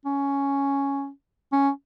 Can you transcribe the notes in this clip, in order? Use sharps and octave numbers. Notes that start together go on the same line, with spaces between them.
C#4
C#4